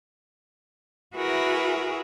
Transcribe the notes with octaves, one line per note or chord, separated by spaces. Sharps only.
E4 F#4 G#4 A#4 B4 E5